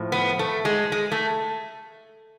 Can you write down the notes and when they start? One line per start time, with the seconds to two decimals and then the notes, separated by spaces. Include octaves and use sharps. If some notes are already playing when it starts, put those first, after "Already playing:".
Already playing: A2 F3
0.12 B3
0.39 A3
0.65 G#3
0.92 G#3
1.12 A3